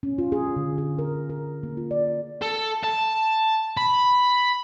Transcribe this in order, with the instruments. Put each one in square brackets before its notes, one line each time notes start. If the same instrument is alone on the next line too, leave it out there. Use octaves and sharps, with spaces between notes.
[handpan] C#4
F4
G#4
D3
G#4
A#4
A#4
A#3
F4
D5
[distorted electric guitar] A4
A5
B5